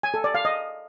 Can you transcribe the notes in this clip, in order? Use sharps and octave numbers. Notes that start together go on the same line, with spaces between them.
G#5
A4
D5
F5
D#5